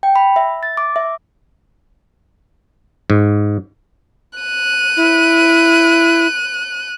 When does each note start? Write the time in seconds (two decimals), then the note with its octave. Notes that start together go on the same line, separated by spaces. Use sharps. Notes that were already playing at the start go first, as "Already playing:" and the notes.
0.03 G5
0.16 B5
0.36 E5
0.63 A6
0.77 D6
0.96 E5
3.10 G#2
4.39 F#6 D#7
4.97 E4